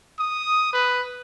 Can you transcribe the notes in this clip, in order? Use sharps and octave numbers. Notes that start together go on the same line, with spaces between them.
D#6
B4